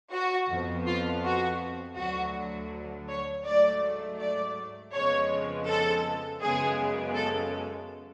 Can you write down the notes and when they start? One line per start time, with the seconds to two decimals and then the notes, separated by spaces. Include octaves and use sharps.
0.13 F#4
0.49 F2 F3 B3
0.86 F4
1.23 F#4
1.97 D2 D3 F#3 F#4
3.08 C#5
3.46 G#2 F#3 A3 D5
4.20 D5
4.93 F2 C#3 F3 G#3 B3 C#5
5.68 A4
6.42 F#2 C#3 G#3 B3 G#4
7.15 A4